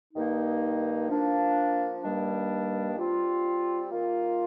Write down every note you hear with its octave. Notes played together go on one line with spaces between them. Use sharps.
G2 D#3 A#3 D#4
F3 A#3 D4
G2 D#3 G3 A#3 D4
G3 C4 F4
D#3 A#3 F4